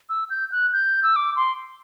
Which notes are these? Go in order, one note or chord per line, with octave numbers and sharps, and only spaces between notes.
E6
G6
F#6
G6
E6
D6
C6